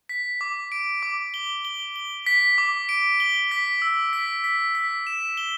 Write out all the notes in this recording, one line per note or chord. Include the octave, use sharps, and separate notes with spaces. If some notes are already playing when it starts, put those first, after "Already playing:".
B6
D6
D7
D6
G7
G7
G7
B6
D6
D7
G7
B6
E6
B6
B6
B6
E7
G7